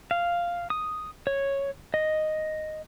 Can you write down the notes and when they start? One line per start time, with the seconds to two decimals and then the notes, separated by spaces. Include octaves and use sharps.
0.11 F5
0.70 D#6
1.27 C#5
1.94 D#5